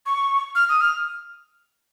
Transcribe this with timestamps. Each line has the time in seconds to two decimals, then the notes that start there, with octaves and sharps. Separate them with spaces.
0.06 C#6
0.55 F6
0.69 D#6
0.81 F6